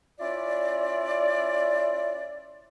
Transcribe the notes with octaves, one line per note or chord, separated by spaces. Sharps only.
C#4 E4 F4 D5